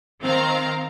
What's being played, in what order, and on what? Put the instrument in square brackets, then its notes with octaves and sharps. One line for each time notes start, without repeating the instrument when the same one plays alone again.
[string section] D#3 C4 F5 A#5